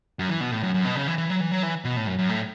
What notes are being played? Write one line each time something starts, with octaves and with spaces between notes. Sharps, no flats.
F#2
E3
B2
A2
F#2
F#2
B2
C#3
E3
E3
F#3
E3
F#3
E3
B2
A2
F#2
F#2
A2